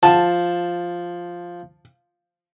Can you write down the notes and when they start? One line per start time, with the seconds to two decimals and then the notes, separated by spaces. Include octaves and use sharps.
0.03 F3 A5